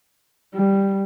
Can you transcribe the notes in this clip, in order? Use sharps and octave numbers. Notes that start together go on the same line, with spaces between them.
G3